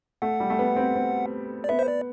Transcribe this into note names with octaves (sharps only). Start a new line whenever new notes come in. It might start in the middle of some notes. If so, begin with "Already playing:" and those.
A3 F#5
G3
A3
B3
C4
C4
D5
B3 E5
C5
D5